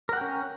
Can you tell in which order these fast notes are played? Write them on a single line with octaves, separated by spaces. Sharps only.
A#4 F#5 G5 C#4